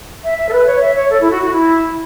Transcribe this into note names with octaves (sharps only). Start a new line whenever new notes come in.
E5
E5
A4
B4
C#5
E5
C#5
A4
E4
F#4
F#4
E4